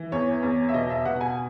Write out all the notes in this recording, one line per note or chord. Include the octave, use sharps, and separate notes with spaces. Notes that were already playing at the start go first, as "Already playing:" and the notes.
Already playing: E3
E2 C#5
E2
E5
B2 D#5
E5
B2 F#5
F#5
G#5